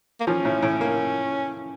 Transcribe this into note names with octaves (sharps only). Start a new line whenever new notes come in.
A#3
F3 C#4
A2
A2
A#3